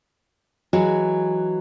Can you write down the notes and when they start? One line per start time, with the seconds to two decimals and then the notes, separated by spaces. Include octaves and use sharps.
0.73 E3 F#3 G#3 F#4